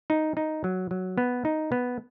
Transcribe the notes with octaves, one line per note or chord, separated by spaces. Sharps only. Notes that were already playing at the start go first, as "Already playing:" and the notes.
D#4
D#4
F#3
F#3
B3
D#4
B3